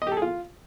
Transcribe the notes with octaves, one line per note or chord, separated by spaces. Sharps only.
D#5
G4
A4
G#4
F4